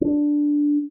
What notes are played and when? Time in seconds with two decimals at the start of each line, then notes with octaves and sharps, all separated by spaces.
0.01 C#4 D4